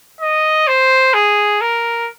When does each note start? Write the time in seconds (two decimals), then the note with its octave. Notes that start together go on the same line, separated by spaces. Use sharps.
0.21 D#5
0.67 C5
1.14 G#4
1.61 A#4